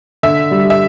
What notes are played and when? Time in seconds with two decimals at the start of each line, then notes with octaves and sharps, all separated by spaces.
0.23 D3 E5
0.51 G3
0.70 E5